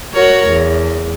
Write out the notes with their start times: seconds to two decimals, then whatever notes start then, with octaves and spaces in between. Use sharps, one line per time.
0.14 F#4 A#4 C#5
0.49 E2